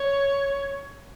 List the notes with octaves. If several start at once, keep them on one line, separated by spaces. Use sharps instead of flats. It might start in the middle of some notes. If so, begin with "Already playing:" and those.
Already playing: C#5